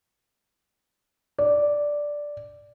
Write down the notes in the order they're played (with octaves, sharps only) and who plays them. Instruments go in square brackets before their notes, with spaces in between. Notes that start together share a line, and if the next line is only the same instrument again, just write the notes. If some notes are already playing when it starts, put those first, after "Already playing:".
[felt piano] D5